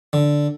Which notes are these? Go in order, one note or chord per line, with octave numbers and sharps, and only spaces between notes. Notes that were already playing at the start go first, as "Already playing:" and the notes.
D3